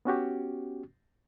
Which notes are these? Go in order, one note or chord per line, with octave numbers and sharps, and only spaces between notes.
B3 C#4 F#4 G4